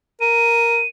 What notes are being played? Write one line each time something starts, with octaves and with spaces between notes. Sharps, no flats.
A#4 D#7